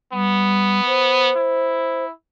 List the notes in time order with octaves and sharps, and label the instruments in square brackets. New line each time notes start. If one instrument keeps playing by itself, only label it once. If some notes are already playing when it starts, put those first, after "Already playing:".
[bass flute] G3 [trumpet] B3
[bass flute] C5
[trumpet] E4